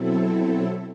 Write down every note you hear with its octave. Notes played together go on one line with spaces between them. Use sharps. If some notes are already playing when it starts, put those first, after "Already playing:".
Already playing: B2 F#3 C4 E4 A4